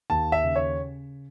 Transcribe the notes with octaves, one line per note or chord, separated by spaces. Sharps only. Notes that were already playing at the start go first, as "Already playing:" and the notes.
D#2 A5
E5
C#3
C#5